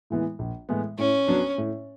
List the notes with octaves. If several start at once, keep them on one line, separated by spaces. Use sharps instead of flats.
A2 E3 G#3 B3
A#1
A2 E3 G#3 B3
A2 C#4
F#3 B3 D4
A2